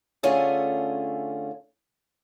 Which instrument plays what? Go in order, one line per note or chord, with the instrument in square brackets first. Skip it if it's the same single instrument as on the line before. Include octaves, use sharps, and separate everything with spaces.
[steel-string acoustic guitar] D3 A3 C#4 F4 G#4